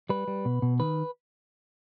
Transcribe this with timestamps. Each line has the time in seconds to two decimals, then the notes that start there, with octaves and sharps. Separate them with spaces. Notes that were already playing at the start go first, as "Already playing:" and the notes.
0.09 G3 B4
0.28 G3
0.45 B2
0.62 B2
0.80 D#3 B4